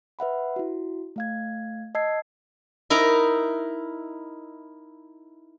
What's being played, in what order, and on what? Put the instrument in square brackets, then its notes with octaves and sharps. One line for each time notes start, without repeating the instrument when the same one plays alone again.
[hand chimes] B4 E5 F#5 B5
E4 F#4
A3 F5 G#6
D#5 A5 E6 G#6 C7
[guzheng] D#4 E4 A#4